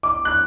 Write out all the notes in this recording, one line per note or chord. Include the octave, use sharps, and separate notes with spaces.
D6
F#6